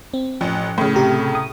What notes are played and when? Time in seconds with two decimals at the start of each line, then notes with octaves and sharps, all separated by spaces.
0.13 C4
0.41 A1 F3
0.78 A2 C#3
0.95 C3 G4 A#5
1.35 D#6